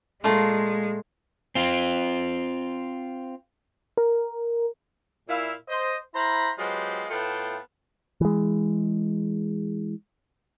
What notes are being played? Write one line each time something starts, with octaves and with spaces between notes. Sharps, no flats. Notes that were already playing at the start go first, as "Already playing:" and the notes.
A#2 G#3 A3 F4
C4 F4
A#4
A#2 E4 F5
C5 D#5
E4 C5 F5 A#5 B5
F#3 G#3 B3 F4 G4 C5
A2 A3 B3 F4 G5 A5
E3 G#3